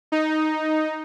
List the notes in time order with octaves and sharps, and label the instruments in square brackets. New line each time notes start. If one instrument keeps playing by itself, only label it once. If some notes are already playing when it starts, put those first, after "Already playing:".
[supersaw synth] D#4